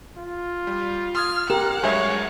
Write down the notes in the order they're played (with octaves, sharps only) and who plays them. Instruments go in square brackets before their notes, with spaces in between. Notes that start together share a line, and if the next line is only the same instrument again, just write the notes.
[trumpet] F4
[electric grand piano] G3
[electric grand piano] C6 D#6 G#6 [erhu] F6
[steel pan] G4 A#4 [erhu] F#5 [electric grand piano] E7
[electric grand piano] G2 F#3 G#3 [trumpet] C#5 [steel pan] E5 G#5